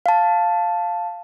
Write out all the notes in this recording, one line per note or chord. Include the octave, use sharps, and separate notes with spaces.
F5 A5